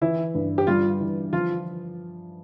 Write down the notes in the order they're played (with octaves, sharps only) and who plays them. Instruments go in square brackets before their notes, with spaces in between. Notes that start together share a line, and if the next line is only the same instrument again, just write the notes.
[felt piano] E3 [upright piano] E4
[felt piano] G2
[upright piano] G4
[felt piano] G3 [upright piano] F4
[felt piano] E3
[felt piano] F3 [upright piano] F4